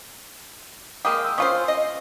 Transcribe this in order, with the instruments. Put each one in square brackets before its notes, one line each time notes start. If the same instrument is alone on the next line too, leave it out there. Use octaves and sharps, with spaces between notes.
[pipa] G#3 A#3 G4 [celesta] D#6
[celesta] E6
[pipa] C#4 F4 C5 [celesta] C#6 D#6
[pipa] D#5